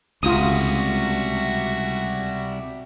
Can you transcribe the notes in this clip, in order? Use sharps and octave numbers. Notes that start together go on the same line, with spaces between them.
C#2 C3 G3 F4 F#4 E5 D#6